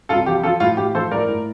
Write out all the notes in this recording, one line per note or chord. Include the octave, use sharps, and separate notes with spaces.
C2 F4 A4
F3 G4
F3 F4 A4
A2 F4
A2 G4
F3 A4 C5
A2 A#4 D5
A2